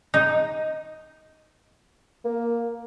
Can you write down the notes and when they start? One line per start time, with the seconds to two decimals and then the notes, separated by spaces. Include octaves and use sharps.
0.14 D#4
2.25 A#3